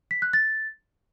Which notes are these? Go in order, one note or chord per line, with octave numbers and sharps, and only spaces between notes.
B6
F#6
A6